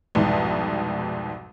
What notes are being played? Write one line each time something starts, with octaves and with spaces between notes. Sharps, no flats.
C2 F2 G#2 B2